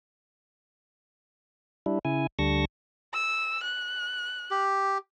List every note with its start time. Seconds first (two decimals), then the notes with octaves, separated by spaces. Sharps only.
1.86 G3 D4 E4
2.05 C#3 E4 G#5
2.39 D2 D3 G3 A5 C#6 A#6
3.13 E6
3.63 F#6
4.51 G4